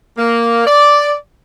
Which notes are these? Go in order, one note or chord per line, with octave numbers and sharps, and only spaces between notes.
A#3
D5